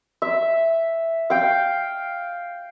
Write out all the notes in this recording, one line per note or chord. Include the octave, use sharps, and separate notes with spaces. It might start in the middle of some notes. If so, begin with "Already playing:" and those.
E5
F5 G5